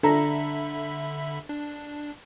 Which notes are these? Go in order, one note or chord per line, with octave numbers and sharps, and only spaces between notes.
D3 D4 A4 E5 A#5 B5
D4